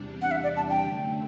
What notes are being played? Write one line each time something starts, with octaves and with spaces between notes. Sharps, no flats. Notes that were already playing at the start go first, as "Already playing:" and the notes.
Already playing: E2 C3 G3 D4
F#5
E5
D5
A5
G5
F#2 D3 A3